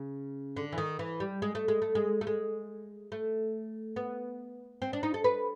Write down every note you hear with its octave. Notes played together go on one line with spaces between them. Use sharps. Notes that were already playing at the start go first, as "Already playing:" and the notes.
Already playing: C#3
D3
E3
D#3
E3
G3
G#3
A3
G#3
A3
G#3
A3
G#3
A3
B3
C4
D4
D#4
A4
B4